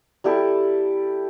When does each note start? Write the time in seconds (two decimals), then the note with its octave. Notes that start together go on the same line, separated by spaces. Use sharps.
0.24 G3 E4 G4 A4